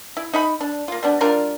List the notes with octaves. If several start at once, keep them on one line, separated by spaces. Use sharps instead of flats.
E4
D#4 E5 B5
D4
A#3 F4
G3 B3 D4
G3 D4 F4 A#4